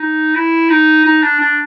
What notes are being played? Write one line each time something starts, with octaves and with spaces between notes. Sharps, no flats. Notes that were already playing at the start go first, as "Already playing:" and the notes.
Already playing: D#4
E4
D#4
D#4
D4
D4